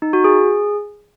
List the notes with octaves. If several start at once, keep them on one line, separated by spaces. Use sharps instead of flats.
D#4
F#4
G#4